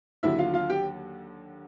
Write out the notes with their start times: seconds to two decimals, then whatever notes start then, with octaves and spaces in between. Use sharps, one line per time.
0.23 D#2 D3 F#3 E4 E5
0.39 F4 F5
0.54 F4 F5
0.70 G4 G5